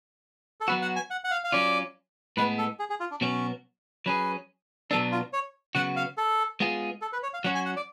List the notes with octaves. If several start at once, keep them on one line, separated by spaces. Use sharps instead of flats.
A4
F#3 B3 F#4 B4
F#5
G#5
F#5
F#5
F5
F5
F#3 C#4 F4 D5
A2 G#3 B3 B4
A4
G#4
G#4
F4
D4
B2 F#3 B3 C#4
F#3 C#4 G#4 B4
B2 F#3 B3 D4 A4
F4
C#5
C#3 F#3 B3 F#4 F#5
F5
A4
G#3 B3 F4 G#4
A4
B4
C#5
F5
F#3 C#4 F#4 F#5
G#5
F#5
D5